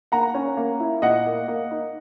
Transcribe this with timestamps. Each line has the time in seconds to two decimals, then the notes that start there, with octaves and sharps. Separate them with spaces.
0.12 A#3 F#5 A#5
0.34 C#4
0.57 A#3
0.80 E4
1.02 A#2 D#5 F#5
1.26 A#3
1.48 A#3
1.71 D#4